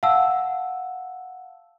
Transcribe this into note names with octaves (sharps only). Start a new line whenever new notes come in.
F5 F#5 A5 E6